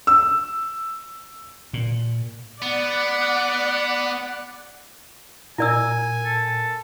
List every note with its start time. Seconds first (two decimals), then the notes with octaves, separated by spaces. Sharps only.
0.07 E6
1.73 A#2
2.62 B3 D5 F#5
5.58 A#2 E4 A#4 D5 G#5 E6
6.25 A4